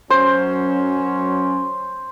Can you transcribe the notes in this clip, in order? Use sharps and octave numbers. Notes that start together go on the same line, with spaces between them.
F#2 F#3 C#4 C5